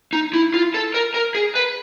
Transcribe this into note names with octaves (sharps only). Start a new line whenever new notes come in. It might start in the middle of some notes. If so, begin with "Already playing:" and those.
D#4
E4
F4
A4
A#4
A#4
G#4
B4